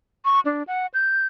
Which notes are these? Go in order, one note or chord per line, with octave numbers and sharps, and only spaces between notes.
C#6
D4
F#5
G6